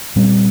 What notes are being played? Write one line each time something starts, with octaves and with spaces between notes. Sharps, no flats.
A#2 G3 C4